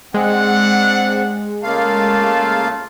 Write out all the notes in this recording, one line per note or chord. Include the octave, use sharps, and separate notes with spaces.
G#3 C4 D4 F#5
C#3 A3 A#3 F4 F5 A5